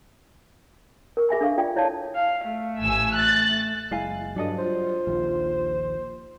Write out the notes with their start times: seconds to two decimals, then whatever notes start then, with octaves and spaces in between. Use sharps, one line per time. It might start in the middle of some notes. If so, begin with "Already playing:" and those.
1.17 A#4 C#6
1.29 G#4 E5 G#5 B5
1.41 D4 A4 F5 C#6
1.58 F4 A4 D5 G5
1.76 E4 C#5 D5 F5 A5
2.15 F5
2.47 A3
2.80 A1 G#5 E6
3.15 F#6 A6
3.91 F#1 G#3 E4 F5 G#5
4.36 G2 F#3 G3 D4 A4 D#5
4.58 F4 C5
5.07 A#1 D#2